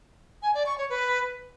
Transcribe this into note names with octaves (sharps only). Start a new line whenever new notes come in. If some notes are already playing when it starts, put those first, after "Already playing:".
G#5
D5
C#6
C#5
B4